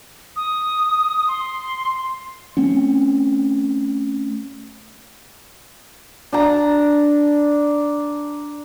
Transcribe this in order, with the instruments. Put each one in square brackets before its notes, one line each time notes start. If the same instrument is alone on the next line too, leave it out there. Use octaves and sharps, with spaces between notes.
[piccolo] D#6
C6
[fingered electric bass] A3 C4 C#4
[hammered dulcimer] D4 A5 A#5